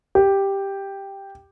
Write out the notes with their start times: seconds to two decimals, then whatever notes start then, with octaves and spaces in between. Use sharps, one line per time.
0.15 G4